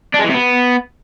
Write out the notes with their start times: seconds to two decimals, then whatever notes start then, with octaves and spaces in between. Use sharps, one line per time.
0.14 D4
0.19 G#3
0.24 E3
0.29 C3
0.34 B3